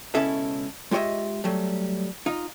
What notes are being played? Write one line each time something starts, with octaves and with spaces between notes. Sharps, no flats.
C#2 B2 C#4 E4 A4 E5
G#3 F4 G4 C#5 D#5 E5
F#3 G3 A3
D#4 F4